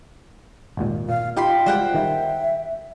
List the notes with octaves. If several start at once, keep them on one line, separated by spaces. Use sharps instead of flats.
G#1 D#2 A#2
A#2 F5
D#4 F4 G4 G5 B5 C6
G3 G#3 C5 D5 F#5 G5
D#3 G3 E5